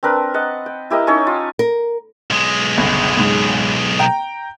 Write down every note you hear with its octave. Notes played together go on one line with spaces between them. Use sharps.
C4 D4 A#4 B4
D#5 F#5 A5
G5
E4 G4 A#4 D#5
C#4 D#4 A4 C#5
F4
A#4
B1 G#3
G1 C#2
C#2 G#2
G5 A#5